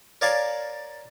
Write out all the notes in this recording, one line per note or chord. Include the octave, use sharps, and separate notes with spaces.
A#4 C#5 D5 F5 G#5 A5